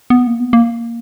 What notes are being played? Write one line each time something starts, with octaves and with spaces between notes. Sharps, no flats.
B3
A#3
B3
A#3